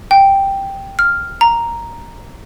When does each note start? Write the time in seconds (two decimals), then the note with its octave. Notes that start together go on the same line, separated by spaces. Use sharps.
0.11 G5
0.99 F6
1.41 A#5